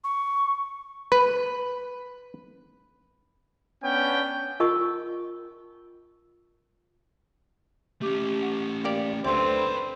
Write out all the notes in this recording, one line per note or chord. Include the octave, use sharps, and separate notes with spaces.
C#6
B4
B3 C#4 D4 G5
F4 A#4 D#5 A5 C#6
A3 C#4 G4 D6
F#5
A#3 G4 D5
D2 D3 C4 B4 D5 C6
B5